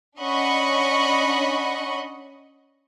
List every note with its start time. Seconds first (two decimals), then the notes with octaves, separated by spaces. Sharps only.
0.19 C#4 D4 D#5 F#5 B5 C#6